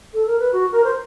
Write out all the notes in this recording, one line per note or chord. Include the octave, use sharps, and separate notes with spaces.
A4
A#4
B4
F#4
A#4
C5